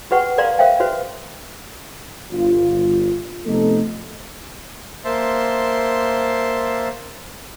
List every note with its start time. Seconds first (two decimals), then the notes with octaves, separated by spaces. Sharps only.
0.11 F#4 G4 B4 F#5 G5 C#6
0.38 A#4 B4 D5 F5 A#5 C6
0.59 A#4 C5 E5 F5 G5
0.80 F#4 B4 C5
2.32 G1 F4
3.46 C3 F3 A3 B3 D#4 A4
5.05 A#3 C5 E5 A5 C6